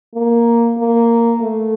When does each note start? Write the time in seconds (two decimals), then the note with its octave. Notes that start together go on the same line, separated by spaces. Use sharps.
0.14 A#3
0.78 A#3
1.41 A3